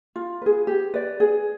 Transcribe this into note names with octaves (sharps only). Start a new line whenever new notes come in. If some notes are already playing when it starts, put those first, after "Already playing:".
F4
G#4 B4
G4
B4 D5
G#4